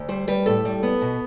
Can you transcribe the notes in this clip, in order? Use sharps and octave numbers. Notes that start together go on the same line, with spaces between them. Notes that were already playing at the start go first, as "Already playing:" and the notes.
Already playing: D2
G3 C5
G3 B4
A2 A4
G3
B3
B2